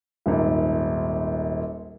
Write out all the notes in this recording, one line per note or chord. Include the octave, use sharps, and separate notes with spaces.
D#1 G#1